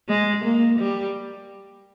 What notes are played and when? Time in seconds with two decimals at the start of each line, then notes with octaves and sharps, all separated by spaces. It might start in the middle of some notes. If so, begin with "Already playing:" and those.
0.09 G#3
0.45 A#3
0.79 G3